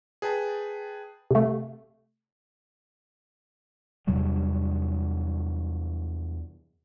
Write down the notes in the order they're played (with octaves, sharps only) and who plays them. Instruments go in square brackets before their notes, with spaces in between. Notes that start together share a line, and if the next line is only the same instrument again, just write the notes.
[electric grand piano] G#4 B4 G5 A5
[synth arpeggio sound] C3 A3
[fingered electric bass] E2 C3 F#3 G3